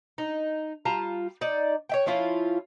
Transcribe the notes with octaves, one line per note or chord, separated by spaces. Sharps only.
D#4
G3 F4 A5 A#5
D#4 D5
C#5 E5 G5
F3 C#4 E4 F4